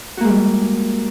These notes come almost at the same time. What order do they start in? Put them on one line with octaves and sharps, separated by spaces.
F#4 A#3 G#3 G3